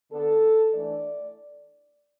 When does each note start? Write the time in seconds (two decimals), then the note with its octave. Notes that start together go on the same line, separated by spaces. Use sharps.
0.12 D3 B3 D4 A4
0.73 E3 A3 D4 D5